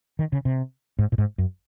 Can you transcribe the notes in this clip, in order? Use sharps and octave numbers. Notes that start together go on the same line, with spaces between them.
D#3
C#3
C3
G#2
A#2
G#2
F#2